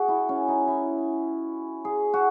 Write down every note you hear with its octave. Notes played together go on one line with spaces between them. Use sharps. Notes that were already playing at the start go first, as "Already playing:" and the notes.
Already playing: F#4 G#4
E4
C#4
D#4
E4
G#4
F#4